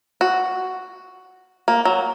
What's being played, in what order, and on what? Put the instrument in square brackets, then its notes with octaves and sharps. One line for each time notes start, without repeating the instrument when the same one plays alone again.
[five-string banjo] F#4
A#3
F#3